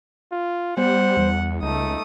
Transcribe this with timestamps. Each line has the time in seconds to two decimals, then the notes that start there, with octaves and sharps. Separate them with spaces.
0.32 F4
0.77 G3 B3 C5 F#5
1.17 E2 G3
1.62 C#2 A3 D#4 D#6